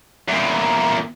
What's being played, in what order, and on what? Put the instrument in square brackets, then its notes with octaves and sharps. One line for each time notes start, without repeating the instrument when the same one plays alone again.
[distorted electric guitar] E2 A#2